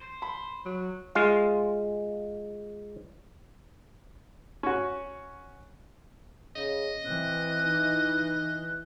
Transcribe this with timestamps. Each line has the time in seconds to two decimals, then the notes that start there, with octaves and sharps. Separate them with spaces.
0.01 C5
0.22 B5
0.65 F#3
1.15 G#3 F4 F5
4.63 C#4 F#4
6.56 C#3 D#5
7.05 E3 C4 F#6
7.64 D#4